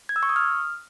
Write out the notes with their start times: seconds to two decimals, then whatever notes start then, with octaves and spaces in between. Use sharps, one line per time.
0.09 G#6
0.16 E6
0.23 C#6
0.29 D#6
0.36 F6